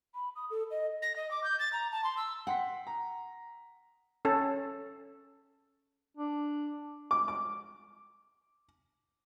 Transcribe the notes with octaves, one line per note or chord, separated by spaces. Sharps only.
B5
D#6
A4
D#5
A#6
D#5
D6
G6
A6
A#5
A5
C6
E6
F#5 G5 C6 B6
A#5
C#4 A4
D4
D6
D6